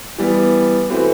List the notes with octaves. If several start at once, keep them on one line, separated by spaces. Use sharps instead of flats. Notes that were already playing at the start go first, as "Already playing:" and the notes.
E3 G3 B3
E3 A3 C4 F#4 B4